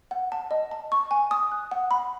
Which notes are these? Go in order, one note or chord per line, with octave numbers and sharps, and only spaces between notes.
F#5
A5
D#5
A5
C#6
G#5
D#6
F#6
F#5
B5